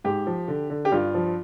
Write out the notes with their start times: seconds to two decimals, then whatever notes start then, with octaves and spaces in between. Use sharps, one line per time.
0.04 G#2 G4
0.27 F3
0.48 D3
0.70 D3
0.85 G4
0.92 G2 F4
1.14 F3